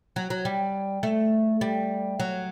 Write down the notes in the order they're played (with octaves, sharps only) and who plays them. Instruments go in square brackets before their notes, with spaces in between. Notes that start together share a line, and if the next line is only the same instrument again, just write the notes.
[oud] F#3
F#3
G3
A3
G3
F#3